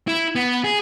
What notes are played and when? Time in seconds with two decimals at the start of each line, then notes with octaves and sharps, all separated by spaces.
0.08 E4
0.35 B3
0.64 G#4